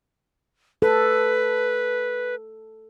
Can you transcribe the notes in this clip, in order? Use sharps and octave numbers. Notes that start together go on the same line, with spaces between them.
A4 B4